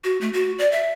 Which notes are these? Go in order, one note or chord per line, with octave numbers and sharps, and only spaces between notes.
F#4
A3
F#4
D5
E5